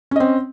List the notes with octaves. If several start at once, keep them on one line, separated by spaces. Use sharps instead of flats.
C4 C#4 D#5